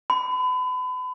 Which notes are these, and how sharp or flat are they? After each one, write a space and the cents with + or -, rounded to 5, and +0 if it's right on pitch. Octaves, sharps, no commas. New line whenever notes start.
B5 +35